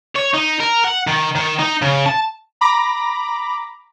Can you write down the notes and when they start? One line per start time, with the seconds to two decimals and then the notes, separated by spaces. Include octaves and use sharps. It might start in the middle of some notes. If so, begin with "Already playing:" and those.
0.16 C#5
0.34 D#4
0.60 A#4
0.84 F#5
1.07 D#3
1.35 D#3
1.60 D#4
1.82 C#3
2.06 A5
2.61 A#5 B5 D6 A#6